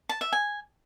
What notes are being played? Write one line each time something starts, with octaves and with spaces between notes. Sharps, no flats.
A5
E5
G#5